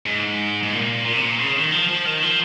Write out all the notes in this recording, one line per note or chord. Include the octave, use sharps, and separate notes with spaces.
G#2
G#2
A#2
A#2
C3
A#2
C#3
D#3
F3
F3
D#3
F3